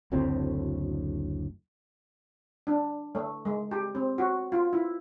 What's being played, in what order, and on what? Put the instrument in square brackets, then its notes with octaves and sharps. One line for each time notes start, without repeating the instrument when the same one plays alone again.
[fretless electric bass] F#1 D2 A2 C4
[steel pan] D4
A3
G#3
G4
C4
F#4
F4
E4